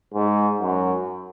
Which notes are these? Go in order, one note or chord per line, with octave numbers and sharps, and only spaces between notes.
G#2
F#2